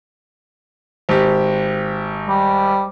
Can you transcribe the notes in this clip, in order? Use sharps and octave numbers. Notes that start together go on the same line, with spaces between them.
G#1 G4
G3